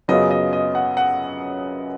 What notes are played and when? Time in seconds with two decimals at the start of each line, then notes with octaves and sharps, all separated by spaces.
0.08 F#2 C#3 F#3 B3 F4 D#5
0.31 D#5
0.53 D#5
0.75 F#5
0.97 F#5